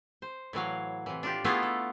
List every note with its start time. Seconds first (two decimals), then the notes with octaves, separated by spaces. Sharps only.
0.22 C5
0.53 A2 E3 F#3 F5
1.06 C3 E3
1.23 D4 F4 G4
1.44 A3 B3 E4 F4 G#4
1.63 A4